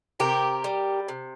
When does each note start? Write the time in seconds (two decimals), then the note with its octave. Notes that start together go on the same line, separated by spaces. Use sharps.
0.20 C3 G4 A#4
0.64 G3
1.08 C3